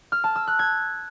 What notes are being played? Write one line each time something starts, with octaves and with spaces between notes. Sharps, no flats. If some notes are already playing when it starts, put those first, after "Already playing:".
F6
A5
E6
F#6
G#6